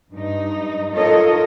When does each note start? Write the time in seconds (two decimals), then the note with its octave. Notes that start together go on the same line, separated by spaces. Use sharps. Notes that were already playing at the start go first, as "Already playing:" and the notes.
0.12 G2 D#4
0.93 D#4 F4 A4 A#4 C#5 D#5